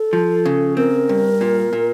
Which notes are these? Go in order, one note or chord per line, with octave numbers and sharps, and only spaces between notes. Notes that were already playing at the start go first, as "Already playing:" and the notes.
Already playing: A4
F3
C#3
C4 A#4
G2
A#2
A#2